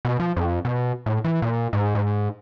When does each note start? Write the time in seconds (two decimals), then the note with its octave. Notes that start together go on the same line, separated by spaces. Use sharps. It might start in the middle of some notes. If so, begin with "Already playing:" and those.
0.05 B2
0.20 F3
0.37 F2
0.65 B2
1.06 A2
1.24 E3
1.42 A#2
1.73 G#2
1.95 G#2